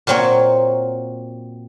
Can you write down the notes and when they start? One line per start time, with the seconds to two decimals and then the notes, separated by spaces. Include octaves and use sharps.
0.07 A#2 F#3 A#3 C4 C#5